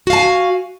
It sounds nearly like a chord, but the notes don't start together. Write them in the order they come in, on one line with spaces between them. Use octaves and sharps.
F#4 F5 A5 G#5